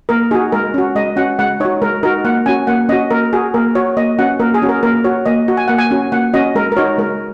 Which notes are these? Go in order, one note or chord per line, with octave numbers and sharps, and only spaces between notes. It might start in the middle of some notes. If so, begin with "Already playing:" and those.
A#3 A#4
D#4 F#4 G#4
G#3 A#4
C#4 F#4
G#3 D#5
C#4 F#4 F#5
G#3 F#5
D#4 F#4 C#5
G#3 A#4
D#4 F#4 A#4
A#3 F#5
C#4 F#4 G#5
A#3 F#5
C#4 F#4 D#5
A#3 A#4
F#4 G#4
A#3 A#4
F#4 C#5
A#3 D#5
C#4 F#4 F#5
A#3 A#4
G#4
C#4 F#4
A#4
A#3 A#4
F#4 C#5
A#3 D#5
F#4
G#5
A#3 F#5
G#5
C#4 F#4
A#3 F#5
C#4 F#4 D#5
G#3 A#4
A#4
D#4 F#4 C#5
G#3 A#4